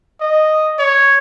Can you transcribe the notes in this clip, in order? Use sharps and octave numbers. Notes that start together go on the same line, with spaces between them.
D#5
C#5